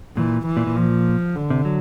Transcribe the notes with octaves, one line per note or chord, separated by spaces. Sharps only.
A#2 E3
E3
A#2
A#2
F3
D3
C3
F#3